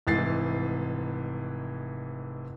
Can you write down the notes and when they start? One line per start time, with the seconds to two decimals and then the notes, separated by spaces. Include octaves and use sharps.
0.07 F1 G#2 E3 A6 C7